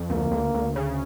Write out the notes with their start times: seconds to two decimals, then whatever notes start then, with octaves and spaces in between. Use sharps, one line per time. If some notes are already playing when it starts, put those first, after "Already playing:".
Already playing: F2
0.10 D2 A#3
0.31 D2
0.54 D2
0.76 C#3